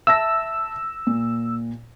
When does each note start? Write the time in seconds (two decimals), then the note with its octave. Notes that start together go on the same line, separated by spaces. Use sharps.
0.07 E5 A5 E6 A#6
1.07 A#2